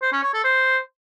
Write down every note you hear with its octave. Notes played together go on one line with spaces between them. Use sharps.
C5
C#4
C#5
A4
C5